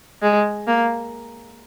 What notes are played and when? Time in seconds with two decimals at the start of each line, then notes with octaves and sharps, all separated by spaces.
0.22 G#3
0.67 A#3